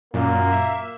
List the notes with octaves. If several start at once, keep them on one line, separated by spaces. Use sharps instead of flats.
F#2 A#2 A#3
E5